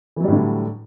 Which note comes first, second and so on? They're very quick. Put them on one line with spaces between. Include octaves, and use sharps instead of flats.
E3 F#3 G3 A2 D3